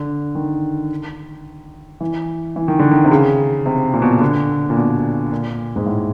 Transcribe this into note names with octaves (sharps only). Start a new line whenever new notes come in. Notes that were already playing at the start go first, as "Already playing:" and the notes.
Already playing: D3
D#3
E3
E3
D#3
D3
D#3
C3
C#3
C3
A#2
B2
A#2
D3
A#2
B2
A#2
G#2
A2